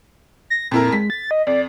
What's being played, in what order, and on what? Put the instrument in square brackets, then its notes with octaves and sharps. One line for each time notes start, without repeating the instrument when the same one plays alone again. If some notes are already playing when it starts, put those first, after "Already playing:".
[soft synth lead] A#6
[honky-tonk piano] F2 E4 A#4 [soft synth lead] A#2
[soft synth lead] G#3 [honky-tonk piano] B6
[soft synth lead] A6
D#5
[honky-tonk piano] F2 [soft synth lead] D5